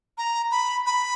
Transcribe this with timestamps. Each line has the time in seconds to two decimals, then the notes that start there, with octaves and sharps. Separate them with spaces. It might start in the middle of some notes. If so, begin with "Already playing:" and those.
0.18 A#5
0.51 B5
0.86 B5